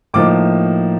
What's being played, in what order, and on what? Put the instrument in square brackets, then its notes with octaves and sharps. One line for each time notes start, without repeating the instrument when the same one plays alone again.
[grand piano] A2 F3 A#3 D#4 D6